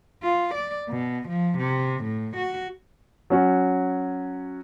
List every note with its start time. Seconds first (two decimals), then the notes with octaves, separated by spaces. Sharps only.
0.23 F4
0.54 D5
0.89 B2
1.29 F3
1.59 C3
2.04 A2
2.37 F#4
3.30 F#3 C#4 F#4